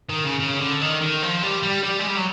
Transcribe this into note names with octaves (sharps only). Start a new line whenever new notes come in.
D#3
C#3
C#3
D3
D#3
D#3
F3
G3
G3
G3
G#3
G3
F#3